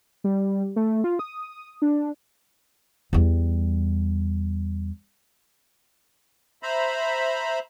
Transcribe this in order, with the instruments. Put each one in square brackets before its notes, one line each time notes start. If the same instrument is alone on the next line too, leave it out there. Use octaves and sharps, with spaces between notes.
[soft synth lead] G3
A3
F4
D#6
D4
[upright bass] E2 G3
[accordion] C5 E5 A#5 B5